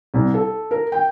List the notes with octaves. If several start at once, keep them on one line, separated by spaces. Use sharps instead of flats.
C2
A4
A#4
G5